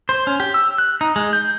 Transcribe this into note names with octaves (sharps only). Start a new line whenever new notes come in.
C5
C#4
G4
E6
F#6
D#4
G#3
G6